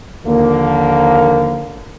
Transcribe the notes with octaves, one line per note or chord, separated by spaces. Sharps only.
D#2 D3 F3 A#3